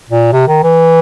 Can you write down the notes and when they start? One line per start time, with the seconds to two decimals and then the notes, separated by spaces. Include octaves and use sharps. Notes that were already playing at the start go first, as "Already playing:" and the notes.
0.09 A#2
0.32 C3
0.48 D#3
0.63 E3